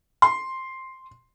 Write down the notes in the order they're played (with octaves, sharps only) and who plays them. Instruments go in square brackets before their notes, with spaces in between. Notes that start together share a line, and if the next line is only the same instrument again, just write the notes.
[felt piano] C6